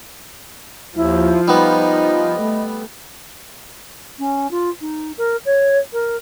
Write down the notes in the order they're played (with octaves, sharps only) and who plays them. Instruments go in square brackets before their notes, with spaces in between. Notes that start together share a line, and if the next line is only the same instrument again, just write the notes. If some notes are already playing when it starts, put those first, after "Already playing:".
[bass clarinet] D#2 [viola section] F3 [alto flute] E4
[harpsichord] G3 B3 [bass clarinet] D#4 [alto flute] D#5
[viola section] A3
[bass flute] C#4
F4
D#4
A#4
C#5
A#4